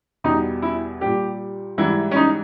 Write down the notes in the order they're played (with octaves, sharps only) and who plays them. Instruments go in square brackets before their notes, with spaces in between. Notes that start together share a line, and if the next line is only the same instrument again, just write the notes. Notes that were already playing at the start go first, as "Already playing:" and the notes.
[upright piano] E2 B2 G3 D#4
E4
A#2 G3 G4
G#2 E3 G3 E4
C#4
D#4